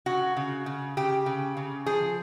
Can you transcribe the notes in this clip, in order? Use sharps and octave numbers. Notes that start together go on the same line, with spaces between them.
C#3 F#4
C#3
C#3
C#3 G4
C#3
C#3
F3 G#4